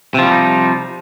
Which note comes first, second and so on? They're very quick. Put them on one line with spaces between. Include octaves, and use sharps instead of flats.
C3 F3 G3 C#4 D#4